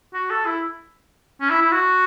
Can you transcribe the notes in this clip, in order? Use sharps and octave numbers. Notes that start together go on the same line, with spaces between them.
F#4
A4
E4
C#4
E4
E4
F#4